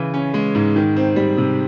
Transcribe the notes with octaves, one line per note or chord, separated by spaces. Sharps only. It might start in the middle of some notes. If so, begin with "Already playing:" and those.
Already playing: C#3 E3
C#4
G#3
G#2
D#3
C4
G3
C3